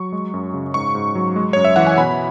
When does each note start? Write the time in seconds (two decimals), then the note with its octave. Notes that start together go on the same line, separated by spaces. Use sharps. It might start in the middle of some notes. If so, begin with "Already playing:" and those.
Already playing: F#3 C#6
0.12 G#3
0.34 F#2
0.54 C#3
0.74 G#2 C#6
0.95 G#2
1.15 F#3
1.36 G#3
1.53 F#2 C#5
1.65 E5
1.76 E3 F#5
1.87 G#5
1.98 B2 B5